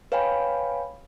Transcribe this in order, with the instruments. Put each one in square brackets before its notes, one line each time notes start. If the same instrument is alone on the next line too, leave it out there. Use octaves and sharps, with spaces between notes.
[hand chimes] B4 C#5 F5 G5 G#5 B5